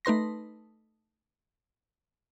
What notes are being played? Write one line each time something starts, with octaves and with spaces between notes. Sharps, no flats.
A3 D#4 B4 C6 A#6